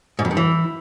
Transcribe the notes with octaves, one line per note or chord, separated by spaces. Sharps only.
G#2
F2
G2
E3